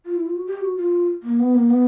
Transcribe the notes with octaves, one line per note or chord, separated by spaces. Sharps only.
F4
E4
F4
F#4
G4
F#4
F4
A#3
B3
A#3
B3